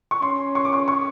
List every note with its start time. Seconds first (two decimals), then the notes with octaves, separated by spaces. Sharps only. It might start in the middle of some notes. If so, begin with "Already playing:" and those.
0.11 C#6
0.22 C#4 C6
0.55 C#6
0.65 D6
0.73 C#6
0.88 C#6